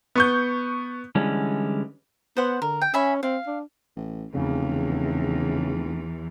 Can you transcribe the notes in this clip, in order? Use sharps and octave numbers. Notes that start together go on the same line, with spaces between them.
B3 C#6 G6
D3 E3 G3 G#3 C#4
B3 C5 F#5
D3 A#4
G5
C#4 E5 G#5 B5
C4 F5
D4
A1
F1 E2 C#3 E3